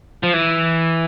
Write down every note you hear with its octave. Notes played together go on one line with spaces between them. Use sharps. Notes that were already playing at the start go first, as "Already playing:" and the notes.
F3
E3